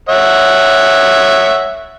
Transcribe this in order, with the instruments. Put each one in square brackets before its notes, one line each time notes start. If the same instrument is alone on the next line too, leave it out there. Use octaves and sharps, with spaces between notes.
[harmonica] C#5 E5 F#5